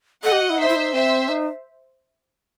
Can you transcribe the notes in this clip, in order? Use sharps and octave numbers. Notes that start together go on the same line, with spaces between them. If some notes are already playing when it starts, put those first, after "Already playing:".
A4 D#5 F#5
G4
F#4
E4
D#4 C5 E5
E4
D#4
C4 C5 E5
D#4